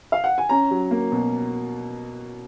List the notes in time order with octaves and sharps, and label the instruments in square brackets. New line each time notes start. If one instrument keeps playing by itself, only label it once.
[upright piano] F5
F#5
G#5
C#4 A#5
F#3
A#3
B2